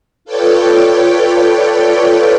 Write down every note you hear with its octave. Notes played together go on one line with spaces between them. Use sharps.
F4 A4 B4 C#5 D5 G5